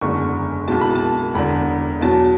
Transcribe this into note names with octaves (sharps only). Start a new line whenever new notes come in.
F#1 E2 D3 G#3 C#6
B1 B2 G#3 A5
B5
A5
E1 E2 D3 B5
E2 B2 F#3 A5